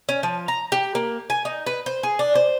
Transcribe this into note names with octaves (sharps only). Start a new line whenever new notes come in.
C#4
F3
A#5
G4
A#3
G#5
D#4
B4
C5
G#4
D4
C5